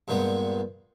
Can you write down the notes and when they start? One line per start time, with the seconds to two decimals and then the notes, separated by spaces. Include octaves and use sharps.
0.08 G2 A#2 G3 G#3 B3